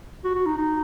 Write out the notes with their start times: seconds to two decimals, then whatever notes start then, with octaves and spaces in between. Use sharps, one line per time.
0.24 F#4
0.35 F#4
0.46 D#4
0.58 D#4